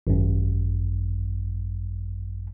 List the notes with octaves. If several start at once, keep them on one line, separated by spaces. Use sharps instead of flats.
G#1 F#2